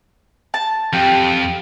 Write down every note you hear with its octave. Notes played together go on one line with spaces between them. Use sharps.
A5
F2 G4